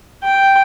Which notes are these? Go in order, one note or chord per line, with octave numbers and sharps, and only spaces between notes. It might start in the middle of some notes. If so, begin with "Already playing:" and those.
G5